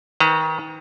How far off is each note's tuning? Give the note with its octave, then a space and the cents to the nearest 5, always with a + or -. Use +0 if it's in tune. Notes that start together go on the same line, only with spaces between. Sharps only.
D#3 +30 B4 +30 A#5 -25